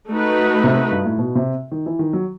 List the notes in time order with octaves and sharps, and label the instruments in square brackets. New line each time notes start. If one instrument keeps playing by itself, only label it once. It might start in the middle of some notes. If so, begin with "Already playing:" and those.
[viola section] A3 D#4 F#4 B4
[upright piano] C3
G2
A2
B2
C3
D#3
E3
D#3
F#3